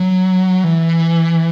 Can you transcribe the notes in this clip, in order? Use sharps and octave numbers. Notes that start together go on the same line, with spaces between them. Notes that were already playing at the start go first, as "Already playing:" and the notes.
Already playing: F#3
E3